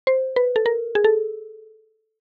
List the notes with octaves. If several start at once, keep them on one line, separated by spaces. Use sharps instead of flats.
C5
B4
A4
A#4
G#4
A4